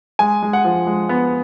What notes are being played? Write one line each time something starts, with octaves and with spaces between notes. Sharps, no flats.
G#3 G#5
G#3
F#5
F3
G#3
B3